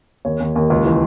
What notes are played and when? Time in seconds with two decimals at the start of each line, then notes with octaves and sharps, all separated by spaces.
0.25 D#2 C#5
0.40 D#2
0.55 D#2
0.70 C#2
0.85 E3